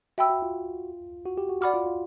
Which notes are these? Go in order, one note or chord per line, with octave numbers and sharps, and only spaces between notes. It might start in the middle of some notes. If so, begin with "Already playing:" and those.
F#4 E5 G5 B5 E6
F#4
F4
F#4
G4
F#4
F#4 D5 F#5 B5 D6 F6
F4
F4